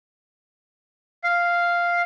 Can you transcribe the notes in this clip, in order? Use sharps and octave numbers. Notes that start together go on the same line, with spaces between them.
F5